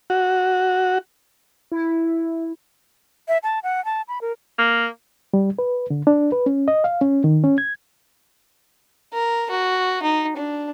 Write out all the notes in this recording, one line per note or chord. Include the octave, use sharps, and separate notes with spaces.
F#4
E4
E5
A5
F#5
A5
B5
A#4
A#3
G3
B4
D3
D4
B4
C#4
D#5
F5
C#4
D#3
C#4
G#6
A#4
F#4
D#4
D4